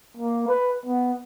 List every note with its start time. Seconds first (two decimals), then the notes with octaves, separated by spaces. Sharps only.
0.17 A#3
0.48 B4
0.86 B3